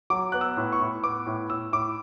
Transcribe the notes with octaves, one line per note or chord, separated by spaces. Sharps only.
F#3 D6
B3 F#6
E6
A2
C#6
A2
B3 D6
A2
A2 E6
A2 D6